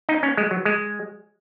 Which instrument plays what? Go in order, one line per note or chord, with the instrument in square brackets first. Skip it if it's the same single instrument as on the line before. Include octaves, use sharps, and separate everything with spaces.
[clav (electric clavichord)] D#4
C#4
G#3
F#3
G#3